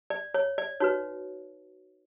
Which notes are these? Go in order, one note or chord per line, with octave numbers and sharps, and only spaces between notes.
D5
C#5
D5
D#4 F#4 B4 C#5